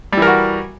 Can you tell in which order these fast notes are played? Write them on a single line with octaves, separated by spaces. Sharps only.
G3 E3 A#4 F#4